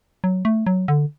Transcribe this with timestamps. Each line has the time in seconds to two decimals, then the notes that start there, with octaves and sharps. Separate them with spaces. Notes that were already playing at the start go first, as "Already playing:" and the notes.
0.24 F#3
0.45 A3
0.67 F#3
0.88 D3